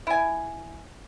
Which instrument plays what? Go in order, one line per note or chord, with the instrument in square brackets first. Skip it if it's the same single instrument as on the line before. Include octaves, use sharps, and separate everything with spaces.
[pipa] E4 G#5